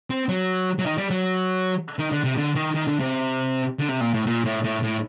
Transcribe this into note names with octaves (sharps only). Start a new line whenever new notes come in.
C4
F#3
F#3
D#3
G3
F#3
D#3
D3
C3
D3
D#3
D#3
D3
C3
D3
C3
A#2
A2
A#2
A2
A2
A2